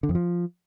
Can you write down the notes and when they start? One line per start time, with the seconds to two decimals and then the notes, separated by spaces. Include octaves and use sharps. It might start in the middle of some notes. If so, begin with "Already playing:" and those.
0.03 D3
0.09 F2
0.15 F3